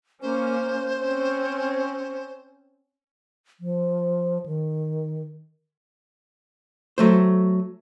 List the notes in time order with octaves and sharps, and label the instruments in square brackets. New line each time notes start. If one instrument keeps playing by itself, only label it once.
[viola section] A#3 C#4 [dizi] C5
[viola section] C4 C#4
[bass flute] F3
D#3
[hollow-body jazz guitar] F#3 A3 C5